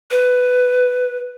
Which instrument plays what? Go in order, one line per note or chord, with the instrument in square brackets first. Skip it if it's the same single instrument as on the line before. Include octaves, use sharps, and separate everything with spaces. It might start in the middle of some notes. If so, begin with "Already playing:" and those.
[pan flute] B4